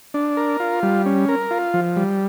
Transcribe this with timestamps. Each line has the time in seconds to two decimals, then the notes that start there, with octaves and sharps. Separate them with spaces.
0.14 D4
0.37 A#4
0.60 F4
0.83 G3
1.06 C#4
1.29 A#4
1.51 F4
1.74 F3
1.97 G3